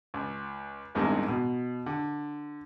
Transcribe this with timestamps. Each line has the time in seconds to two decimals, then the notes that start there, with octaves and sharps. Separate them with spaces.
0.14 C#2
0.95 A1 E2 G2 C3 D#3 G#3
1.28 B2
1.86 D3